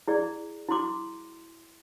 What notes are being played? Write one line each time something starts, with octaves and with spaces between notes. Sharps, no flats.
E4 G#4 D5
E4 F#4 C6 D6